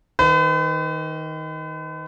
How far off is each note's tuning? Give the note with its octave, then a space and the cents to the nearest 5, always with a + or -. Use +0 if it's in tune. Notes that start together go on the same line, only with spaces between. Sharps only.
D#3 +15 B4 +45